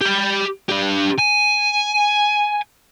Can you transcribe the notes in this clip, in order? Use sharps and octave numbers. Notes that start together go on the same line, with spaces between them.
G4 B5
D4 G4
G#5